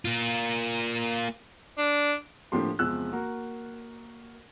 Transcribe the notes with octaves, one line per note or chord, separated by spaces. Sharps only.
A#3 F4
D4
A2 D3 F3 A#3 G4 C6
E2 C3 F3 G#3 E6 F#6
A#3 F#4 A#4